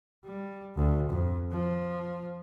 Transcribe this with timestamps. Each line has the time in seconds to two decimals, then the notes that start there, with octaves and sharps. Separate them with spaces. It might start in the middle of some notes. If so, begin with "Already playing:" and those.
0.25 G3
0.76 D2
1.10 F2
1.52 F3